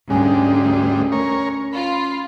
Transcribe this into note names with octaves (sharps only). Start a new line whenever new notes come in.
D2 G#2 G3 C#4
A#4 C#5
F4 B5